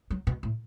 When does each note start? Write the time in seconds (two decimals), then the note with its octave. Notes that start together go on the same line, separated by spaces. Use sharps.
0.10 F#3
0.27 B2
0.43 A2